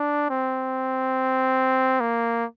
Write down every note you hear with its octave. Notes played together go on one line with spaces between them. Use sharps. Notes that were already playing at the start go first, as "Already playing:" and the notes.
Already playing: D4
C4
A#3